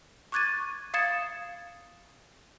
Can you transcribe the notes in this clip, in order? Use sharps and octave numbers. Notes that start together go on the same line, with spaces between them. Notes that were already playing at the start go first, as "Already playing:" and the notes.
C#6 D6 F#6 G#6 A6 D#7
F5 D#6 G#6 A6 C#7 E7